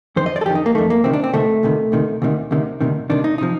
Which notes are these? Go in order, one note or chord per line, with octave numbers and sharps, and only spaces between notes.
F2 D#3 C5
D#5
D5
A4
F2 D#3 G4
D#4
A#3
F2 D#3 A3
A#3
D2 C3 D#3 C4
D4
C4
D2 C3 D#3 A3
D2 C3 D#3
D2 C3 D#3
D2 C3 D#3
D2 C3 D#3
D2 C3 D#3
D2 C3 D#3 D4
D#4
C3 F3 D#4